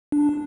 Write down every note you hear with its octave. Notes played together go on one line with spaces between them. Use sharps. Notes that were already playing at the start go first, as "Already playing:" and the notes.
D4